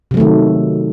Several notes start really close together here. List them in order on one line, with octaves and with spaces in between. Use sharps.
C3 F#3 A3 D#3